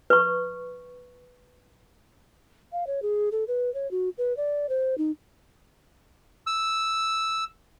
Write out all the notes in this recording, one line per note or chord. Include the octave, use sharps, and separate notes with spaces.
B4 C#6
F5
C#5
G#4
A4
B4
C#5
F#4
B4
D5
C5
D#4
E6